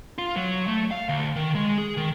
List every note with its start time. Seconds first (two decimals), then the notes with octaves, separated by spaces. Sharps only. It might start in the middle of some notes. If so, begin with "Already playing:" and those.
0.18 F4
0.36 F#3
0.68 A3
0.91 F5
1.09 D2
1.36 D#3
1.55 G#3
1.78 G#4
1.97 D#3